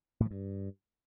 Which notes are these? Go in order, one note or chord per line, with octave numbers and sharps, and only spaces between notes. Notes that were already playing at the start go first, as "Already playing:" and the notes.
A2
F3
G2